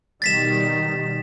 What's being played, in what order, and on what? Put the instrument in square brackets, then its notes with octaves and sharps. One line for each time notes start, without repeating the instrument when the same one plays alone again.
[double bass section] B2 D#3 G3 [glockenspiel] A6 B6 E7